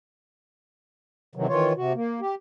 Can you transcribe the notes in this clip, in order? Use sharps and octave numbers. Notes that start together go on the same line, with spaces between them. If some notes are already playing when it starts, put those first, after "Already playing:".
C3 D#3 E3 F#3
D#3 E3 F4 C#5
C3 F#4
A#3
G4